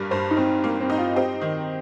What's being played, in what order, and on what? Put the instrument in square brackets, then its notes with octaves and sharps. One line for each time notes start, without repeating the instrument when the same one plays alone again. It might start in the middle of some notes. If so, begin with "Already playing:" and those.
Already playing: [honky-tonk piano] G2 G3 A#3
[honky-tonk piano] G2 [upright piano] C5
[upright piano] D#4
[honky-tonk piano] G2 [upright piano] C4
[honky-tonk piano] A#3
[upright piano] C4
[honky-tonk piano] D#4
[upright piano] F4
[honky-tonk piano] C4 [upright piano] G4
[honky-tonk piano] D#3